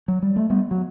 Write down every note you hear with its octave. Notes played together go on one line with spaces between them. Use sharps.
F#3
G3
A3
G3 B3
F#3